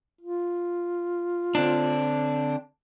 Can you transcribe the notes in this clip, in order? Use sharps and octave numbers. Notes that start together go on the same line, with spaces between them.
F4
D3 C4 D4